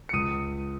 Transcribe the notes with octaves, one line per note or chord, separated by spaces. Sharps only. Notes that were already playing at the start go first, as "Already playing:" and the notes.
C#7
C#2 D#6 D#7